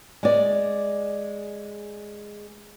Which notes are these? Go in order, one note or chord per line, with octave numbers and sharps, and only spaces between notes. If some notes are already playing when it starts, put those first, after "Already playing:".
G#3 D5